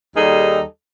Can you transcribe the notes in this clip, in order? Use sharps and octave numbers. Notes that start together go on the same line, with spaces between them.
D#2 G3 D#4 G#4 A4